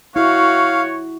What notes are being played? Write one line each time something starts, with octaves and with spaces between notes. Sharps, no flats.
E4 F#4 C#5 F5